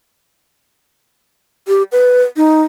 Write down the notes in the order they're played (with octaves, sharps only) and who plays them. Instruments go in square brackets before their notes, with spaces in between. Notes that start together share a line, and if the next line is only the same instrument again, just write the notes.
[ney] G4
B4
D#4